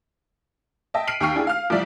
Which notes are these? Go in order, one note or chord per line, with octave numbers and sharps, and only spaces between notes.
D#5 E5 G5 A5
F6 B6 C7 D7 D#7 F#7
D#2 G5 C#6 F6 C7
D4 E4 G#4
F5 F6
C2 F3 D5 E5